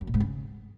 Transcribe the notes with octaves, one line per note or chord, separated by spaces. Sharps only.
F#2
A#2
G#2
C#3